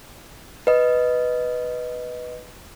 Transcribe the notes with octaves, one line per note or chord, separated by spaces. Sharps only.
B4 D#5